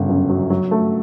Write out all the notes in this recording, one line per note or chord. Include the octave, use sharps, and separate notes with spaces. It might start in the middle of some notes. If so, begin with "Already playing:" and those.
Already playing: G1 C#3
F#2
F#3
F#3
A3